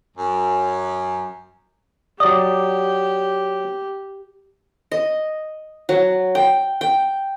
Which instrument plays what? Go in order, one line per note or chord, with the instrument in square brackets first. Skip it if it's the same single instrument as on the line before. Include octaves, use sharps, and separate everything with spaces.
[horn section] F#2
[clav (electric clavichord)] F#3 D5 [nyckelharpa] G4 [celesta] D#6
[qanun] D#5
F#3
G5
G5